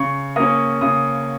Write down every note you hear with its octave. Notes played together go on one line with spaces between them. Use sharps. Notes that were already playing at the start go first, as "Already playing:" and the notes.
Already playing: C#3 C#6
A#3 C#4 D#6
C#3 D#6